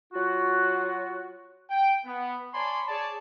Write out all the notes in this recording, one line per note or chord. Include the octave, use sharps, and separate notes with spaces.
F#3 F4 F#4
G5
B3
C#5 D5 G#5 A5 B5 C6
G#4 C#5 D5 A5